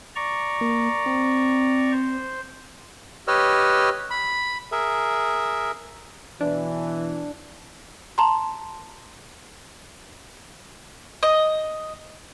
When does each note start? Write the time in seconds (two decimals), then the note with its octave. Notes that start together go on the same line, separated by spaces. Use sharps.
0.15 D5 A#5 C#6
0.61 A#3
1.06 C4
1.92 C5
3.28 G4 B4 C#5 D#5 E6 F6
4.11 B5
4.72 G#4 A#4 E5
6.41 B2 E3 D4
8.18 A5 A#5 C6
11.23 D#5